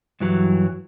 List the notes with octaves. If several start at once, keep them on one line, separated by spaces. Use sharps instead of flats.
G2 E3 F#3